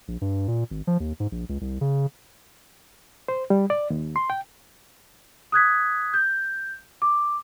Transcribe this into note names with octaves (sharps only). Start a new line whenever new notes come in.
A#1
G2
A#2
G#1
F3
D#2
G#2
A#1
C#2
C2
C#3
C5
G3
D5
D#2
C6
G5
D#6 F#6 G#6 B6
G6
D6